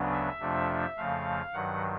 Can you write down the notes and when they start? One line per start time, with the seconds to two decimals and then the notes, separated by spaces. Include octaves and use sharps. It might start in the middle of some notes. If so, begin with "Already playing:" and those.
Already playing: D2 C#3 F#3 B3 D4
0.12 E5
0.40 F2 C3 F3 A3 D4
0.97 F2 C#3 F3 A3 F5
1.53 G2 D#3 F#3 F#5